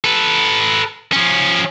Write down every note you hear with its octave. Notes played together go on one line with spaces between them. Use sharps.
A4 B4
F3 C#4